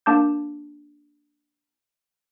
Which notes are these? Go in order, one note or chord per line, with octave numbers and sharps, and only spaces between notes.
A#3 D4 A5 D6 G6